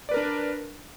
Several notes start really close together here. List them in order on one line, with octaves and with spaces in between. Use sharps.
D5 B4 A#4 D4